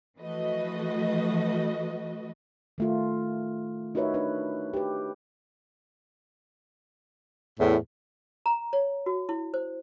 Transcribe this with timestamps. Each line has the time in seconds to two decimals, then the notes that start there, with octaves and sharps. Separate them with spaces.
0.18 E3 F3 A3 F#4 B4 D#5
2.78 D#3 A3 F4
3.95 D#4 F#4 A#4 B4 C#5 E5
4.14 D4 B4
4.74 G4 B4
7.60 E2 A2
8.46 A#5
8.73 C#5
9.06 F#4
9.29 E4
9.54 C5